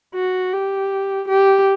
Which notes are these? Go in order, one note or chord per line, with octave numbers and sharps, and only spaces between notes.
F#4
G4
G4